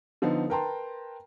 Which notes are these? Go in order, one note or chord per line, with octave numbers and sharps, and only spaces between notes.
D3 F3 B3 D#4
A#4 B4 G5 A5 A#5 C6